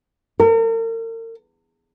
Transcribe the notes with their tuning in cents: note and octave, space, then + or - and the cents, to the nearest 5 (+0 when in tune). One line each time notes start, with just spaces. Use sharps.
A#4 -40